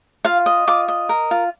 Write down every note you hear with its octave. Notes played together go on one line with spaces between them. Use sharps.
F4 F5
D#5
F4 D6
D#5
A#4
F4